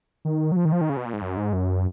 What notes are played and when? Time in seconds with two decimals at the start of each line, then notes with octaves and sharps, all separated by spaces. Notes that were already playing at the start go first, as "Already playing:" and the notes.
0.25 D#3
0.52 F#3
0.56 F3
0.65 D#3
0.72 F3
0.81 D#3
0.90 C#3
0.97 B2
1.06 A#2
1.13 G#2
1.22 F#2
1.37 G#2
1.53 F#2